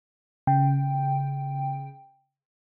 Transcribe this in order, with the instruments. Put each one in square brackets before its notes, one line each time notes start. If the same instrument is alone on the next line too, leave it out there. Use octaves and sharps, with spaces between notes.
[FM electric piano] C#3 G5